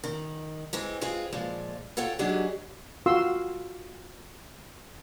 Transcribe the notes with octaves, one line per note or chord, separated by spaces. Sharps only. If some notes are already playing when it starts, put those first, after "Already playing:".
D#3
E3 G#3 C4
G#3 C4 F4 G#4
A#2 F3 G#3
F4 A4 C#5 F#5 G5
F#3 G#3 D4 D#4 G4 G#4
F4 F#4 F5 C6 E6